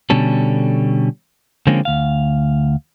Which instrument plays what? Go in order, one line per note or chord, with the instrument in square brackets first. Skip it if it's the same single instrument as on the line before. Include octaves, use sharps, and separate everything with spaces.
[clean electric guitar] B2 D3 G3 C#4 A4
D3 F3 G#3 A#3 C4 C#4
D2 F5